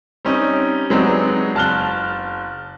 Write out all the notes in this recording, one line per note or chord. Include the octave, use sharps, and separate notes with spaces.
G3 C4 C#4 D#4
F#3 G#3 B3 C4 D4 D#4
F#1 A5 F6 F#6 G7